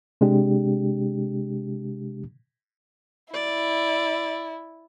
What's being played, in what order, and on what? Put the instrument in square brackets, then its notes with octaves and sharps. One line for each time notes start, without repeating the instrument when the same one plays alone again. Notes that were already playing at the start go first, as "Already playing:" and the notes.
[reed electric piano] C3 G#3 D4 G4
[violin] E4 [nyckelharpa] D5